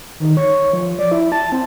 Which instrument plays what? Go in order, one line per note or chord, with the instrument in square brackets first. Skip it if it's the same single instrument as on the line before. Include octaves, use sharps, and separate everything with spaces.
[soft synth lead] D#3
C#5
F3
D5
E4
A5
C4